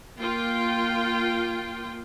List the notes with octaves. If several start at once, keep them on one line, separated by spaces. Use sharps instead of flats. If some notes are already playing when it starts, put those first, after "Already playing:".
A#3 F4 G5